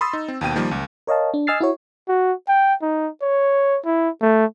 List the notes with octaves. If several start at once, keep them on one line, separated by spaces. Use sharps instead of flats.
B5 C6 D#6 E6 A6
D#4
C4
D#2 B2 G5 D#7
D#3 F3 G3 A#3
C#2
A#4 C#5 D#5 F5 A5
D4
D#5 G#5 E6 F6 A6 C7
E4 F#4 C#5
F#4
G5
D#4
C#5
E4
A3